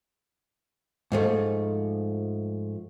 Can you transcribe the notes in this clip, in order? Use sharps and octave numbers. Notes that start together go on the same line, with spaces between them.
G#2 F3 A3